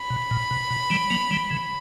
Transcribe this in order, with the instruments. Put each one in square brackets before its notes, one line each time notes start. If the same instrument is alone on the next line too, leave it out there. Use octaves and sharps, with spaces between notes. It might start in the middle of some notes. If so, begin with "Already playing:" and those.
Already playing: [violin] B5
[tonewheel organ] B2
A#2
B2
B2
E3 G3
F#3 A#3
E3 G3
C#3 E3